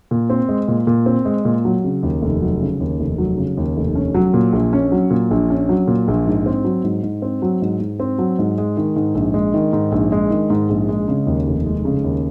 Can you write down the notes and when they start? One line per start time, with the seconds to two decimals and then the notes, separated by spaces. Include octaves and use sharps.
0.11 A#2
0.30 C4
0.49 G#3
0.68 A#2
0.87 A#2
1.06 C4
1.25 G#3
1.45 A#2
1.65 F#3
1.84 C#3
2.03 D#2
2.22 F1
2.41 F#3
2.61 C#3
2.80 D#2
3.00 F1
3.18 F#3
3.38 C#3
3.57 D#2
3.77 F1
3.95 C#4
4.14 F#3
4.34 A#2
4.53 A#1
4.73 C#4
4.92 F#3
5.10 A#2
5.31 A#1
5.50 C#4
5.69 F#3
5.87 A#2
6.08 A#1
6.27 G#2
6.46 C4
6.64 F#3
6.84 G#2
7.03 G#2
7.22 C4
7.42 F#3
7.62 G#2
7.80 G#2
8.00 C4
8.19 F#3
8.39 G#2
8.58 G#3
8.77 D#3
8.96 G#2
9.15 A#1
9.34 G#3
9.54 D#3
9.73 G#2
9.92 A#1
10.12 G#3
10.30 D#3
10.50 G#2
10.69 A#1
10.89 G#3
11.08 C#3
11.27 D#2
11.47 F1
11.66 G#3
11.85 C#3
12.04 D#2